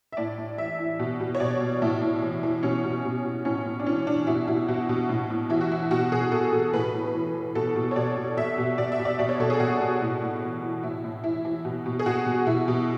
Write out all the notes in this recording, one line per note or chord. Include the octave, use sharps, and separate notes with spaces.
E5
A2 D5
A2
E3 E5
E3
B2
B2
C#5
B2 D5
B2
A2 E4
A2
E3
E3
B2 C#4
B2
B2
B2
A2 C#4
A2
D4
E3 C#4
E3 D4
B2 E4
B2 E4
B2 F#4
B2
A2
A2
E3 E4
F#4
E3 E4
B2 F#4
B2 G#4
B2 A4
B2 A4
A2 B4
A2
E3
E3
B2 A4
B2
C#5
B2 D5
B2
B2 E5
B2
B2 D5
E5
B2
D5
B2 D5
C#5
B2 A4
G#4
B2 F#4
B2
A2
A2
E3
E3
A2 E4
A2
E3 E4
E3
B2
B2
G#4
B2 F#4
B2
B2 E4
B2